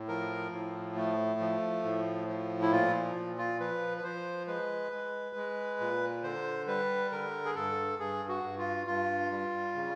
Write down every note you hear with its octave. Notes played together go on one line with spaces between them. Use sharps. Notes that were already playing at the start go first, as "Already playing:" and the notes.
Already playing: A2
F3 A#4
A2
A3
F3
A2
F3
E4
A#2 F4
A#2
F4
F3 B4
B4
F3 C5
G#3 B4
G#3
G#3
A#2
D3 C5
G3 B4
D3 A#4
G#4
G2 A4
G2 G#4
F#4
G2
F4
G2 F4
G3
C#3